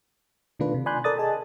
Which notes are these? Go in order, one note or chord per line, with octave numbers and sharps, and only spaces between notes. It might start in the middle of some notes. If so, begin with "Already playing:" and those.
B2 D#3 A3 D4 F4 B4
C3
D5 G#5 B5 C6 F#6 G6
A4 A#4 D5 D#6 A6
G#4 D#5 G#5 A5